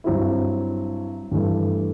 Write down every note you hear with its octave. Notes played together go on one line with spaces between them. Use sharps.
G2 F#3 C4 E4
G2 E3 A3